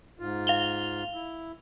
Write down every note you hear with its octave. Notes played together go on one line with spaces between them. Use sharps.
G#2 F4
F5 F7 G7
E4